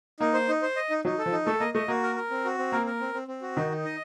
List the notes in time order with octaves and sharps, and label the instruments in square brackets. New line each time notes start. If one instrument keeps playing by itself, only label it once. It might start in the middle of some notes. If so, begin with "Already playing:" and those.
[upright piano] A#3 [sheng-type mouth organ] D#4
[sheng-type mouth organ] C5
D#4
C5
D#5
D#4
[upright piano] F#3 [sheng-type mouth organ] D#4
[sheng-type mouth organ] A4
[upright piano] F3
[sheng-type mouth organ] D#4
[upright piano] A3 [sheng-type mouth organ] A4
[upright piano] A#3 [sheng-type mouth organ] D#5
[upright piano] A3 [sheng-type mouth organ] D#5
[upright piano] A#3 [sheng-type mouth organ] F#4
[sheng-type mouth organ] A#4
A#4
C4
F#4
C4
[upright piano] A#3 [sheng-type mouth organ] A#4
[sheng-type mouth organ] A#4
C4
C4
C4
F#4
[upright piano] D#3 [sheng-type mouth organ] D#4
[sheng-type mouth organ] D#4
D#5